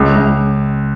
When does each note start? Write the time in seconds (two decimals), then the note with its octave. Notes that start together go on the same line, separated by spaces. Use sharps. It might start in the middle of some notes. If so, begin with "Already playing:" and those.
Already playing: C#2
0.16 C#2